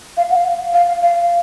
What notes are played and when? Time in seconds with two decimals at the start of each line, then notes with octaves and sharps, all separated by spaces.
0.17 F5
0.30 F#5
0.36 F5
0.73 F5
1.02 F5